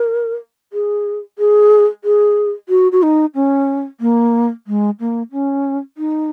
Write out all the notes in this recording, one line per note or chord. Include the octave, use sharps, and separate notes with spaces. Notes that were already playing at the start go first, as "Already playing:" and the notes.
Already playing: A#4
G#4
G#4
G#4
F#4
F#4
D#4
C#4
A#3
G#3
A#3
C#4
D#4